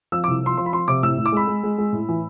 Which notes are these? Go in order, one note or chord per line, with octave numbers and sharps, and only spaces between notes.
F3 E6
C2 D6
F3 C6
F3 C6
B5
F3 C6
C3 D6
A2 E6
A2
D6
G#3 B5
G#3
G#3
G#3
A2
E3